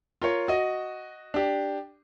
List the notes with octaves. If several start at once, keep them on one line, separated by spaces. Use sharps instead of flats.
F4 A#4 C#5
F#4 D#5
D4 G4